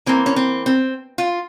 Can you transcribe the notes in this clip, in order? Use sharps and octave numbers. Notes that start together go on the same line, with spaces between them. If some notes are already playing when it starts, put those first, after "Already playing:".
E3 A#3 C4
C#4
C4
C4
F4